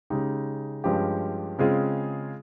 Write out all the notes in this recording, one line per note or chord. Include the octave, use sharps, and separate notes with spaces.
C#3 G#3 D#4 G4
G2 F3 G#3 C#4 G4
C#3 G#3 C4 F4 G#4